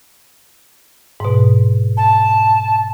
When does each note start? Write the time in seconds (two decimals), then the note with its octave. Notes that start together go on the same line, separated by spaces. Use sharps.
1.20 G#2 B2
1.97 A5